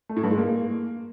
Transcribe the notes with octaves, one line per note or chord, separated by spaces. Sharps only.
A3
A2
G2
G#3
A#3